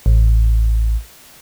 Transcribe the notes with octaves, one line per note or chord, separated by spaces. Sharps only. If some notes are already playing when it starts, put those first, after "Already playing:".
A1